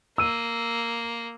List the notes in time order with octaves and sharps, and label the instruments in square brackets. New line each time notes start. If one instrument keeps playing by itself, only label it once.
[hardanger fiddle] A#3 [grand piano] E6 D#7